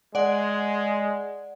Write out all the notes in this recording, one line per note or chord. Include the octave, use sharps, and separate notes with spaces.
G#3 D5 F#5